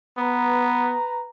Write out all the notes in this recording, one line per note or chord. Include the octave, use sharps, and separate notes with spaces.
B3 B4 A#5